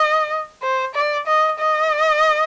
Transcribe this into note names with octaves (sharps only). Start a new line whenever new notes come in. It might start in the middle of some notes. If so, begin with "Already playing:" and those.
Already playing: D#5
C5
D5
D#5
D#5